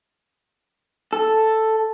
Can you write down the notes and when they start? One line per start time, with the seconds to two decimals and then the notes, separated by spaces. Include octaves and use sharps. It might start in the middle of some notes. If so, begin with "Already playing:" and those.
1.13 A4